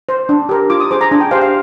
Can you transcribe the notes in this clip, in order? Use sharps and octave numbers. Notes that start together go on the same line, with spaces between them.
C5
D4
G4 A#4
F4 D6
D#6
G#4 C5 D6
A#5
D4 G#5
G5
G4 C5 F5
F5